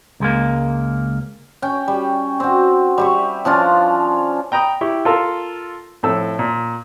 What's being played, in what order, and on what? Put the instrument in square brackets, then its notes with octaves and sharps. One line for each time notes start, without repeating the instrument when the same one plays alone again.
[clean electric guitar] C#2 G#3 A#3
[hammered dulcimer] C#4 G5
G3
C4 F#4
G3 E5 C#6
F3 C#4 D4 F4
[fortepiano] G5 A#5 B5 D#6
E4 G4 C#6
F4 A4 A#4 F5
F2 A2 A4 E6
A#2